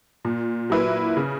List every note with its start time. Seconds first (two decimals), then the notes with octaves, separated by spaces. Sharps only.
0.25 A#2
0.70 F#3 A#3 E4 B4
1.17 C#3